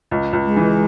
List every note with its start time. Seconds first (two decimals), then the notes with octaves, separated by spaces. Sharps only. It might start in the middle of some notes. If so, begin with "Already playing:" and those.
0.11 C#2
0.33 C#2
0.45 G#3
0.56 E3